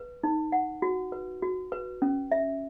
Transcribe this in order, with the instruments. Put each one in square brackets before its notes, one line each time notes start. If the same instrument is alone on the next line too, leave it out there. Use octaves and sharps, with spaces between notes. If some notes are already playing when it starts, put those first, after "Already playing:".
Already playing: [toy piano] B4
D#4
F#5
F#4
B4
F#4
B4
C#4
E5